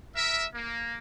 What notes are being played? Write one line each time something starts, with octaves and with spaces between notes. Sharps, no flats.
A#4 E5
A#3